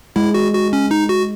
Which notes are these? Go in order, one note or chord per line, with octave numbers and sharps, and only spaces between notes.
G#3 E4
F#4
F#4
C#4
D#4
F#4